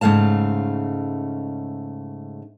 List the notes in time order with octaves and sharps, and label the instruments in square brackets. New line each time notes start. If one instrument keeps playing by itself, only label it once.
[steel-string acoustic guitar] G#2 C#3 A3 F5 A5